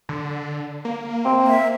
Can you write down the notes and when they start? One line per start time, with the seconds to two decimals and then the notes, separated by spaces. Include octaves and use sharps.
0.09 D3
0.85 A#3
1.25 C4
1.47 E5